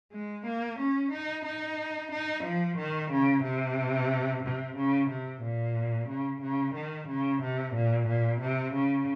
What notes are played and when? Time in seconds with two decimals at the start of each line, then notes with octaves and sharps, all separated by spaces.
0.12 G#3
0.46 A#3
0.79 C#4
1.12 D#4
1.45 D#4
2.12 D#4
2.44 F3
2.77 D#3
3.11 C#3
3.43 C3
4.43 C3
4.77 C#3
5.09 C3
5.42 A#2
6.09 C#3
6.42 C#3
6.75 D#3
7.08 C#3
7.42 C3
7.74 A#2
8.07 A#2
8.41 C3
8.74 C#3